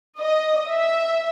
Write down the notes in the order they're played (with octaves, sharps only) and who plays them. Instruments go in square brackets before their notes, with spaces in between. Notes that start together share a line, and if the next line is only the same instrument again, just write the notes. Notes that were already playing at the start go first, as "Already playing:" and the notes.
[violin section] D#5
E5